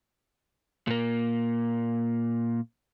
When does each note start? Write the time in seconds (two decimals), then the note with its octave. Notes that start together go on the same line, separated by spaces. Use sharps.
0.87 A#2 A#3